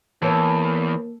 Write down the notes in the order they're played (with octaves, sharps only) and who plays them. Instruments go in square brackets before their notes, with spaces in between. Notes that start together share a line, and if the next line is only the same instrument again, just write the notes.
[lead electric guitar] E2 [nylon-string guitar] E3 C#5 G#5 [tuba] A#3 [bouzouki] A4